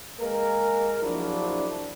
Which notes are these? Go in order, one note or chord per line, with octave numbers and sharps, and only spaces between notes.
G#3 A#3 A#4
A#1 F3 F#3 D4 E4